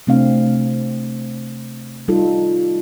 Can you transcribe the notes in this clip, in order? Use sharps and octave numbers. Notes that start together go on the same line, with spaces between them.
C3 A3 C4 D4 F5
G3 D#4 F4 A4